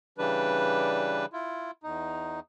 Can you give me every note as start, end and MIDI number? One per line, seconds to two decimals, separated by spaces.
0.18 1.26 49
0.18 1.26 52
0.18 1.26 55
0.18 1.26 62
0.18 1.26 71
1.33 1.71 64
1.33 1.71 65
1.83 2.40 40
1.83 2.40 63